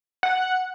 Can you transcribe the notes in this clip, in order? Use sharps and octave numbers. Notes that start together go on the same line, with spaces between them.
F#5